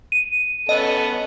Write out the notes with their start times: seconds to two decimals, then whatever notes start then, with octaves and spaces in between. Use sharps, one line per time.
0.12 D#7
0.69 B3 C#4 A4 D#5